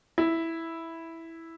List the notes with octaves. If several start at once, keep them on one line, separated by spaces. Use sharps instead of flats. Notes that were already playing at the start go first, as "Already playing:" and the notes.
E4